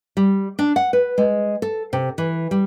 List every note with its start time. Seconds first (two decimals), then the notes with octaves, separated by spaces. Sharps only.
0.17 G3
0.59 D4
0.76 F#5
0.93 B4
1.18 G#3
1.62 A4
1.93 C3
2.18 E3
2.51 G3